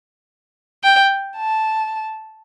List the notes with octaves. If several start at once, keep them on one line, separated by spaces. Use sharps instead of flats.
G5
A5